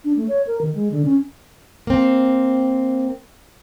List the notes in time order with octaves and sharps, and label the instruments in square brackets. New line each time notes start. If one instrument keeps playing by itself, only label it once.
[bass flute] D4
A3
C#5
A#4
D#3
G#3
D3
C#4
[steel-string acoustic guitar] A#3 C4